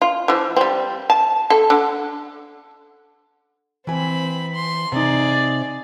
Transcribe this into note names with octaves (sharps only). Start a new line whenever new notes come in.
F4
E3 F3
G3 C4
A5
A4
D3
E3 C4 G#5 B5
C6
C3 D#4 G#4 D5